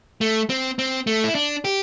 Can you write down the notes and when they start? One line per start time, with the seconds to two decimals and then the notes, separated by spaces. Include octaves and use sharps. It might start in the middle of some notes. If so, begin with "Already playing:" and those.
0.21 A3
0.50 C4
0.79 C4
1.07 A3
1.24 E4
1.35 D4
1.65 G4